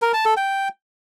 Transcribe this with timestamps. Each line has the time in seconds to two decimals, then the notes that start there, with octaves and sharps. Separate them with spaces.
0.02 A#4
0.14 A5
0.25 A4
0.37 G5